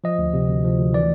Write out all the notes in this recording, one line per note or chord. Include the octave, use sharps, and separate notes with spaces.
F3 D#5
D2
C3
D2
F3
D2
E3 D5